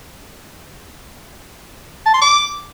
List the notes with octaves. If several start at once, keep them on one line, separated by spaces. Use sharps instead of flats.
A5
C6
D6